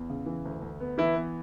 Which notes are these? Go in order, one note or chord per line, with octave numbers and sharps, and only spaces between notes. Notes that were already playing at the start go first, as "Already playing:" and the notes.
Already playing: E2
C#3
E3
D2
D2
B3
E3 E4
B3